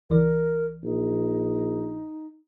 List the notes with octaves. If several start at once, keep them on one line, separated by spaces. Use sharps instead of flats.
C#2 E3 A#4 D5
A#1 D#4